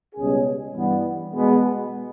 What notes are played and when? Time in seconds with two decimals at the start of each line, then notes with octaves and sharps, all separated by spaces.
0.15 C#2 B2 G3 C#4 G#4
0.74 G2 E3 G3 B3
1.34 B2 G#3 B3